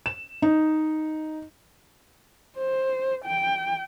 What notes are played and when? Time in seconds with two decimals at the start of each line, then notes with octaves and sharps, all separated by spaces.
0.06 E7
0.42 D#4
2.57 C5
3.25 G5